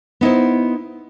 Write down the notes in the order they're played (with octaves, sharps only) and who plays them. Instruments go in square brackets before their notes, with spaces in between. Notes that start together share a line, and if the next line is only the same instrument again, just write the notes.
[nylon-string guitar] B3 D#4 E4 C5